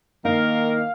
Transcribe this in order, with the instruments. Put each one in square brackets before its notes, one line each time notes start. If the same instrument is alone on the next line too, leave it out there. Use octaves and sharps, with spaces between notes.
[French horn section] D#3 A#3 [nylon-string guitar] D#4 [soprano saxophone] A#4 [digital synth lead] F5